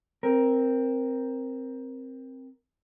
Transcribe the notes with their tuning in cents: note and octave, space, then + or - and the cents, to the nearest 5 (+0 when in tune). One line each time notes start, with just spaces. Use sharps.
C4 +5 A#4 +10